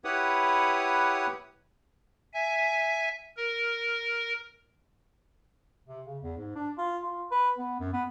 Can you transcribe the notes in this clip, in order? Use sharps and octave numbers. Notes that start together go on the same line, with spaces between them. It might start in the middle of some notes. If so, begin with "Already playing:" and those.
E4 G4 B4 C#5 F#5 D#6
E5 G#5
A#4
C3
C#3
E2
G#2
D4
F4
F4
B4
B3
F#2
B3